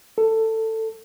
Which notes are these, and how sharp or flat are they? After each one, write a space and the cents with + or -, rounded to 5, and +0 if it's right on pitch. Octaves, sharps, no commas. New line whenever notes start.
A4 +15